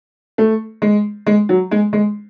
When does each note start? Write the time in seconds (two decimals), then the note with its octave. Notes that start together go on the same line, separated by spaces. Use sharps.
0.38 A3
0.82 G#3
1.26 G#3
1.49 F#3
1.71 G#3
1.93 G#3